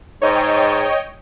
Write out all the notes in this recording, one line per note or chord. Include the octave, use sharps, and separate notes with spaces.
G#2 C#5 D#5 G5